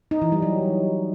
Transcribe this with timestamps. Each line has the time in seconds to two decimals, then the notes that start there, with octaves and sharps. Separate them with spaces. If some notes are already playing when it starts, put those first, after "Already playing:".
0.11 D#4
0.22 E3
0.32 G3
0.42 F#3